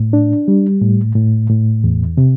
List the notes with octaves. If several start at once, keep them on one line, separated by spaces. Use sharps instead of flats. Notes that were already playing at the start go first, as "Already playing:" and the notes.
Already playing: A2
D4
G3
A2
A2
A2
E2
C3